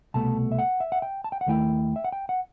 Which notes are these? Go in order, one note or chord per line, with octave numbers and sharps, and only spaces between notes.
C2 B2 A3 A5
E5
F#5
E5
F#5
G5
A5
G5
F#5
D#2 D#3 A3 E4 G5
E5
F#5
G5
F#5